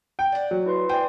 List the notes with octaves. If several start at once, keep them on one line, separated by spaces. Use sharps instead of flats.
G5
D5 F#5
F#3
E4 B4 C6
D4 C5 D5 G5 G#5